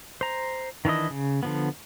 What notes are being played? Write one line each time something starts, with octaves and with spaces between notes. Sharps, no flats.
C5 A#5
D#3 E3 D4 E4 D#5
C#3
D3 F3 B3